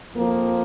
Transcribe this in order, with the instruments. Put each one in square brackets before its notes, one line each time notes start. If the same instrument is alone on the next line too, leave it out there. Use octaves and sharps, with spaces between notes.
[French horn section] F2 F3 A#3